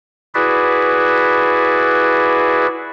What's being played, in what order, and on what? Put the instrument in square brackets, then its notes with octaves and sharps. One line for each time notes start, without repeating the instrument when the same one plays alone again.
[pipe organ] E4 F#4 G#4 B4 D5 E5